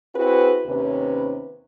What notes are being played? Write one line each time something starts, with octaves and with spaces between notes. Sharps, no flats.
C4 E4 F#4 G#4 B4
D#2 C3 C#4 B4